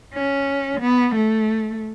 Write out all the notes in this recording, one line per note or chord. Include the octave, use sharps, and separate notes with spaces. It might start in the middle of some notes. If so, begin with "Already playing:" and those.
C#4
B3
A3